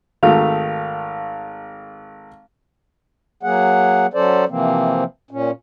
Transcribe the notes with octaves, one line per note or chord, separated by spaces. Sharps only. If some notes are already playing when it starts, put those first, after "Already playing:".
G#1 D#3 A3 F5
F#3 A#3 G#4 F#5
F#3 C#4 A4 C5 D5
C3 E3 F3 A#3 C4
A#2 C#4